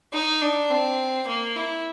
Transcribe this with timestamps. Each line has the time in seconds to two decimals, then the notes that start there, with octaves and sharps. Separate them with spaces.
0.13 D#4
0.42 D4
0.70 C4
1.27 A#3
1.56 E4